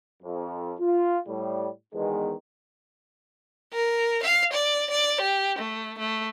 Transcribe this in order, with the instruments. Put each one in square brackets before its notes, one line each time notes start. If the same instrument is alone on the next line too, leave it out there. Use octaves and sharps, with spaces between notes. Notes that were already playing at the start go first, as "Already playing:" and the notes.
[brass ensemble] F2
F4
A2 G3
E2 B2 D#3 G#3
[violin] A#4
F5
D5
D5
G4
A3
A3